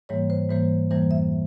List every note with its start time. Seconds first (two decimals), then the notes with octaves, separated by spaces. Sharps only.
0.09 G#2 E3 G3 A#3 C#5
0.30 C5
0.50 G#2 E3 G3 A#3 C5
0.91 F2 E3 G3 A#3 C5
1.11 E5